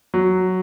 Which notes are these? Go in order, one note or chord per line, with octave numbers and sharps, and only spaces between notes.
F#3